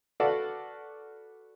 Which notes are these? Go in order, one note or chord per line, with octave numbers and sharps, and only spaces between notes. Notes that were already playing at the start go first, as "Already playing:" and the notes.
F#4 A4 B4 D5 F5 F#5